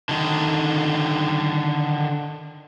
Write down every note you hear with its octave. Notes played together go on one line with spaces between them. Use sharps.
D3 D#3